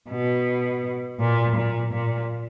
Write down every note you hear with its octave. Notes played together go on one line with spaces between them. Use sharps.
B2
A#2
A#2
A#2